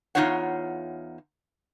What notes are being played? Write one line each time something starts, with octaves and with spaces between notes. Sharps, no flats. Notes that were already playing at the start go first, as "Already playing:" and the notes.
E2 G#2 D#4 F4 C#5 F#5